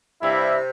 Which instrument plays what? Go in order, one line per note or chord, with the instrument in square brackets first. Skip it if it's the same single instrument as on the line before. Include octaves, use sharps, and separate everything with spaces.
[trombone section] G2 G3 E4 [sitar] C3